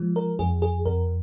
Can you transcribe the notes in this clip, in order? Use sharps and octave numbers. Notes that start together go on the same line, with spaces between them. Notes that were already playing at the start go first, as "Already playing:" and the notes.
Already playing: F3 G#3
A#4
F2 G#4
G#4
F2 A#4